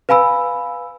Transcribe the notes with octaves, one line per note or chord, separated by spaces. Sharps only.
B4 F5 G#5 B5 E6